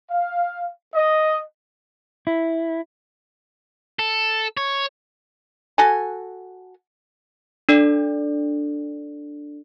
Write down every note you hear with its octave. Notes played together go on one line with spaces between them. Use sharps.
F5
D#5
E4
A4
C#5
F#4 A4 G#5
D4 A4 D5